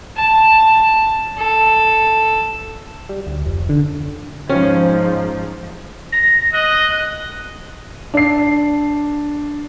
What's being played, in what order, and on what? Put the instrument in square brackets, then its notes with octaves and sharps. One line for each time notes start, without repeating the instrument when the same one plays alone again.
[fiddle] A5
A4
[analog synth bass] G3
D2
F1
D3
[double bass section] G#2 F3 [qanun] C#4
[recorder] A#6
[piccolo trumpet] D#5 [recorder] F#6
[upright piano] D4 C7